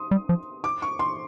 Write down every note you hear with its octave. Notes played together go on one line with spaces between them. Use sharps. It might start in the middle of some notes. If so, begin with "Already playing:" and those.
Already playing: C6 D#6
G3
F3
D6
C#6
C6